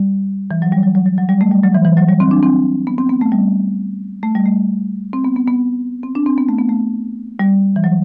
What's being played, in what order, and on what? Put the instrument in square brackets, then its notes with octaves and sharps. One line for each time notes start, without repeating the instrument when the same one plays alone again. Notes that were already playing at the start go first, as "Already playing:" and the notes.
Already playing: [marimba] G3
E3
F#3
G3
F#3
F#3
F#3
F#3
G3
A3
G3
F#3
E3
E3
F#3
G3
C4
D4
C4
B3
C4
B3
A3
G3
A3
G3
A3
C4
B3
B3
B3
C4
D4
C4
B3
A3
B3
A3
G3
E3
F#3